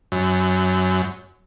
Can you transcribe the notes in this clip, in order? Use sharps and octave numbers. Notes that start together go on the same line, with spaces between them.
F#2